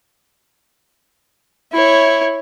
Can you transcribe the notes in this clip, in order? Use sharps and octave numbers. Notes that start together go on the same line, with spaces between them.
E4 C#5